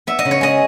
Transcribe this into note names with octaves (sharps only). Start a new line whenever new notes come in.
B3 E5
D#5
C#3
C#5
G#3 D#5